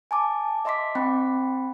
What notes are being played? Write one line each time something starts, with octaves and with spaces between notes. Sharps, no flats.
G#5 A5 D6
D#5 E5 C6 D6 B6
C4 G5 B5